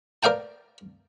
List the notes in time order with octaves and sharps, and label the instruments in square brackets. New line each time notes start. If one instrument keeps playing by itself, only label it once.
[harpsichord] A#4 D5 F5 G5 A5